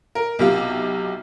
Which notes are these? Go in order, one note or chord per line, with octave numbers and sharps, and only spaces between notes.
A#4
B1 C3 F4